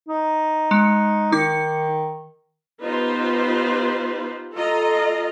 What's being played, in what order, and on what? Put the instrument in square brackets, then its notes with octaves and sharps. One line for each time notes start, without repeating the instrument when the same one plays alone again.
[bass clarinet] D#4
[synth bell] G#3 C#7
[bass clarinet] D#3 [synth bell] D#4 D6 C#7
[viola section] B3 D#4 F4 G4 B4 C5
F4 A4 D#5 A#5